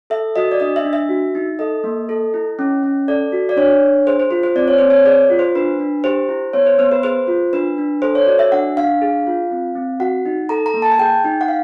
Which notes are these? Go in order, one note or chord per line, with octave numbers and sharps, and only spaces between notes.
A4 E5
F#4 D#5
D5
D4 D#5
E5
D4
E5
F#4
D#4
A4 D#5
A#3
A4
E4
C#4
C#4
A4 D5
F#4
D5
D4 C#5
D4
G#4 C5
C5
F4 C5
C5
C4 D5
C#5
C4 C5
C#5
G#4 D5
F4
C5
D4 B4
D4
G4 C5
E4
B3 C#5
C5
B3 C5
B4
G#4 C5
F4
D4 B4
D4
A4 C5
C#5
F#4 D5
E5
D4 F#5
D4 F5
G#4
F4
C4
C4
F#4 F#5
D#4
A4 A#5
A#5
A#3
A5
G#5
G#4 G5
D#4
F#5
F5